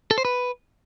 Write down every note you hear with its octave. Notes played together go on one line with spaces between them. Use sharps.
A4
C5
B4